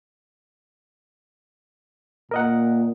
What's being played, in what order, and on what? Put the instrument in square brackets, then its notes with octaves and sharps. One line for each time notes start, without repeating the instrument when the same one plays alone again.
[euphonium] A#2 [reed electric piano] A#4 D#5 F#5